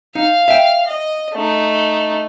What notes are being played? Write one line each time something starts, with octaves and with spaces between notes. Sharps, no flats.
D#4 F5
E5 G5
D#5
A3 D#4